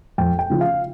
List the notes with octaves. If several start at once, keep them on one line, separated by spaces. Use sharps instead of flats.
F2 G5
G5
C#3 F3
F5